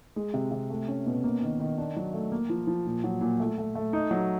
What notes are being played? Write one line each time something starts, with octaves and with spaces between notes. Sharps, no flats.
G#3
C3
C3
A3
C#4
B2
A#3
D#3
D#3
D4
F#3
A3
A#3
F3
F3
A#2
F#3
A#2
A3
A3
A3
D#4
F#3